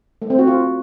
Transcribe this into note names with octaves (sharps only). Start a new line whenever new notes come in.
A3
C4
F#4
F4